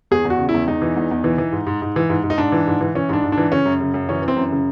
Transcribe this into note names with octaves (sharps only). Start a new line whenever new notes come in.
E2 G#4
E2
F#4
C#3
E4
E2
E2 D#4
E3
E2
E2
E3
E3
G#2
G#2
G#2
E3
G#2
G#2
D#4
G#2 D4
E3
G#2
E3
E3 C#4
G#2 D4
G#2
D4
E3
C#3 C#4
F#2
C#3
F#2
E3 C#4
E3
C4
F#2
C#3